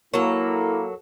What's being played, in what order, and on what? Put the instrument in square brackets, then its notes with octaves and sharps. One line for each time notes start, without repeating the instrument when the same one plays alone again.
[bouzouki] F#3 A4 [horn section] A#3 [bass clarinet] E4 [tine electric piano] F#4 A#4